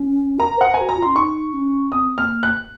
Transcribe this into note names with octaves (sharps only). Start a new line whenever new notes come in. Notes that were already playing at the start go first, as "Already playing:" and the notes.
Already playing: C#4
A#4 A#5
C5 F#5
A#4 G#5
F#4
A#5
F4
C#4 C6
D#4 C#6
C#4
C4 D#6
A#3 F6
F#6